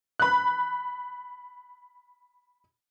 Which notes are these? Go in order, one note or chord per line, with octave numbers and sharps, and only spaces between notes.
B5 F#6